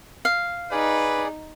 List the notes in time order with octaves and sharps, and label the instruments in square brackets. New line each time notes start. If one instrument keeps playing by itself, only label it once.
[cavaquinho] F5
[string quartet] D#4 [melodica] G#4 D5 [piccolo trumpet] B4